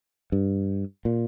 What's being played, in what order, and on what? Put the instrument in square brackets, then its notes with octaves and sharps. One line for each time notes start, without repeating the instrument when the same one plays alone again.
[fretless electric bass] G2
A#2